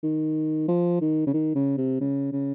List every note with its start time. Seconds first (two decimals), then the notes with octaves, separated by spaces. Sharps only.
0.03 D#3
0.68 F3
1.01 D#3
1.26 C#3
1.34 D#3
1.55 C#3
1.77 C3
2.00 C#3
2.32 C#3